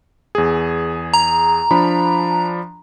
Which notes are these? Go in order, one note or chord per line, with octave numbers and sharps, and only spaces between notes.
E2 G#4
A#5
F3 D4 B5